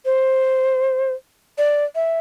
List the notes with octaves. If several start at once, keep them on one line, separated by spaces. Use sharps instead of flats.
C5
D5
E5